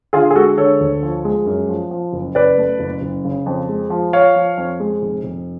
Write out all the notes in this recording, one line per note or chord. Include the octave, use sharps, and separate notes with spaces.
D3 F4 G#4
G#4
G#3 F#4 A4
D3 A4 C#5
D2
F3
G#3
F#2
F3
F3
F#1
F#1 B4 D5
A3
F#1
F#1
C#3
F2
G#3
F3
F3 C#5 F5
F3
F2
G#3
F1
F1